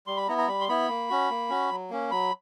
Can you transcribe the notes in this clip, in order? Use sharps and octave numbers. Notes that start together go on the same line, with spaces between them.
G3 C6
B5
B3 E4 A#5
A#5
G3 B5
C6
B3 E4 B5
A#3
C#4 F#4
A#3
C#4 F#4
F#3
A#3 C#4
F#3 B5